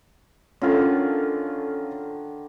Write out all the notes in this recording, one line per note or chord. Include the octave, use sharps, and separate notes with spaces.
D3 D#3 C#4 F4 A4